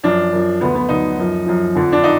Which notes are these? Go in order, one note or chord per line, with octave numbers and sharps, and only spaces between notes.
F#2 F3 D4
F#2 F3
D2 D3 F#3 B3
B3
D2 D3 F#3 D#4
F#2 F3
F#2 F3
F2 D3 F3
D4
D#4